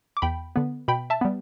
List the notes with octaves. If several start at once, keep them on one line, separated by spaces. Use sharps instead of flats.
D6
E2 G5 B5
D3 B3
B2 G5 B5
E5 A5
G3 B3